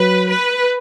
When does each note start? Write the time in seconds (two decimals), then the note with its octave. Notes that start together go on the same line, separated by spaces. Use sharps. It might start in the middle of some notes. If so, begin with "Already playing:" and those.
Already playing: F#3 B4
0.29 B4